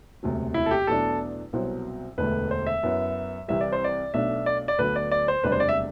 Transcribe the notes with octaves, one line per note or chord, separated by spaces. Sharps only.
E1 D2 C3 F#3
E4
A4
G4
E2 B2 F#3 A3 D4 A4
C2 B2 F#3 C4
E1 D2 D3 A3 B4
C5
E5
F#2 F#3 B3 E4
C2 C3 E3 G3 E5
D5
C5
D5
B1 B2 A3 D4 E5
D5
D5
D2 D3 F#3 B3 B4
D5
D5
C5
E1 D2 C3 G3 D4 B4
C5
D5
E5